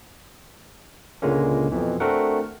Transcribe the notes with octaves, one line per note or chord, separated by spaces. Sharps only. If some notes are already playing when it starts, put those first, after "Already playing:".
C#2 A#2 D3 G#3 A#3 C#4
F2 B2 E3
A3 C4 D4 F#4 A#4 F#5